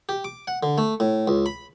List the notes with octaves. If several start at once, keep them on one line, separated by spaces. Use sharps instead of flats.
G4
D6
F#5
D3
A3
A2
C#2
B5